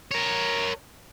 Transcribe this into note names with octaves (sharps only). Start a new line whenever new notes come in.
A#4 C#5